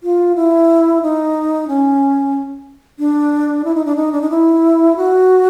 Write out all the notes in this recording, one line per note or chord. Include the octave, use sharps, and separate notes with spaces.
F4
E4
D#4
C#4
D4
E4
D#4
D4
D#4
D4
D#4
E4
F#4